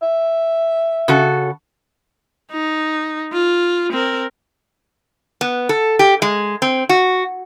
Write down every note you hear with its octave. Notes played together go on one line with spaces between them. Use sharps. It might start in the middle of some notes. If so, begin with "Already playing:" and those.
E5
C#3 F#4 A4
D#4
F4
C4 A#4
B3
A4
G4
G#3
C4
F#4